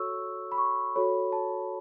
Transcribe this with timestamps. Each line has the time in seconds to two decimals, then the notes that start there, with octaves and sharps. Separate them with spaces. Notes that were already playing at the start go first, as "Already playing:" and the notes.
Already playing: F#4 A4 C#5 C#6 E6
0.52 B5
0.58 C#6
0.96 F#4 A4 C#5 B5
1.32 A5